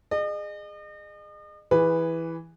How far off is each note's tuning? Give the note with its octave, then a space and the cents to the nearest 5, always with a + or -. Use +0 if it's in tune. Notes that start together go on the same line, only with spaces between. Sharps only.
G#4 +0 D#5 -40
E3 +0 G#4 -30 B4 +0